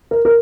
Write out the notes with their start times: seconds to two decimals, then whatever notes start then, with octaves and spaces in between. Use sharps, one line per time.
0.11 A#4
0.25 A#4